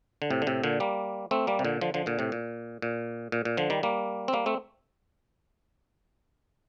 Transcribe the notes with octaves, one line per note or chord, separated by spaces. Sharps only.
D3
A2 C3
D3
A2 C3
A#2 D3
G3 A#3
A3 C4
G3 A#3
C3
A#2 D3
D3 F3
D3 F3
A#2 D3
A2 C3
A#2
A#2
A#2
A#2
D3 F3
D#3 G3
G3 A#3
C4
G3 A#3
A3 C4